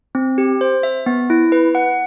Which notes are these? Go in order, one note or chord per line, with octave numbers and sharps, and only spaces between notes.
C4
G4
C5
E5
B3
E4
B4
F#5